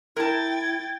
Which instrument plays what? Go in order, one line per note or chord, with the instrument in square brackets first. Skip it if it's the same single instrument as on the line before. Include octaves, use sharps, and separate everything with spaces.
[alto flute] E4 [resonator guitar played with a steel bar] A#4 A5 [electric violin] G5 A6 [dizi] G#6